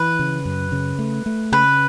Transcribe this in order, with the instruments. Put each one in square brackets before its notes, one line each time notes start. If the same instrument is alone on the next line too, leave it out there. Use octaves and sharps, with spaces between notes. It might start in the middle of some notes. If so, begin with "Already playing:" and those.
Already playing: [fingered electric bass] E3 [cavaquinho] B4
[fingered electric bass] C#3
F#2
C#3
A3
A3
[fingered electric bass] C#3 [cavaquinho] B4